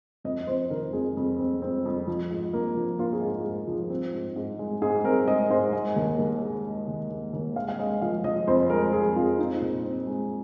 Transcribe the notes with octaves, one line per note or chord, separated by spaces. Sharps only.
F2 D#5
D#5
F2 C5
D#3 A#4
F2 G#4
F2
C4
C4
F2
F3
G#2
A#3
F3
A#3 F4
G#4
G#2
F4
G#2
F3
C4
G#2
G#2
G#3
G#2 G#4
C4 A#4
G#3 D#5
G#2 C5
G#3 D#5
D#2
D#2
G#3
G#3
D#2
D#2
D#2
G#3 F5
F5
G#3 D#5
F3 F5
F3 D#5
F2 C5
G#3 A#4
F3 G#4
F2 F4
C4 D#4
A#2
C4
G#3